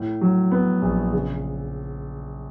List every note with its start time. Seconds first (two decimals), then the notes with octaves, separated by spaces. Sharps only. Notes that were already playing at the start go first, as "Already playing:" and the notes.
Already playing: A2
0.21 F#3
0.52 B3
0.82 A#1
1.13 C#3